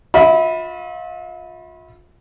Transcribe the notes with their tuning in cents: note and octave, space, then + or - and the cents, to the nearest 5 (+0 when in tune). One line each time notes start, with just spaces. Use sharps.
F4 +35 E5 -35 B5 +0